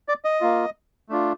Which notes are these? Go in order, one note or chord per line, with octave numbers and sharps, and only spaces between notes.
D5
D#5
A#3 F4
A3 D4 F4